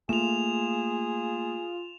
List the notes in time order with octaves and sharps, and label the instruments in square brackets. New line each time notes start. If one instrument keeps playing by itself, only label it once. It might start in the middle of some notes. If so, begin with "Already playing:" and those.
[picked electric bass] A3 A#3 [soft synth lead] F4 [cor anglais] G#4 [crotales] E7 F7